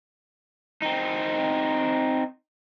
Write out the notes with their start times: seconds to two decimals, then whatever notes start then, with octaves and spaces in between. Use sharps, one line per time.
0.82 C4 D#4